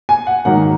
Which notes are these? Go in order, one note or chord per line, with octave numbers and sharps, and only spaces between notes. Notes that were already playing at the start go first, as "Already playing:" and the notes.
G#5
F#5
G#2 D#3 F#3 A#3 F#5